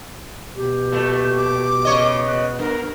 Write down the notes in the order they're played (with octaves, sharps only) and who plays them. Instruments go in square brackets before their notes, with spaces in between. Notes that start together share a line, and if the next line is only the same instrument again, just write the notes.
[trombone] B2 [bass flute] G4
[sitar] A#2 A3
[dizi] D6
[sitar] C#3 C#5 D#5
[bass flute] B3 [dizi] F#6
[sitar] G2 [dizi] A#4